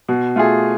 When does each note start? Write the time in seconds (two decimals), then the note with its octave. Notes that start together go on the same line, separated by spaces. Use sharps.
0.09 B2
0.36 A3 F4 G#4